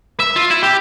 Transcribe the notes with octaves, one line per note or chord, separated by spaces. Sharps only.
E5
F4
E4
G4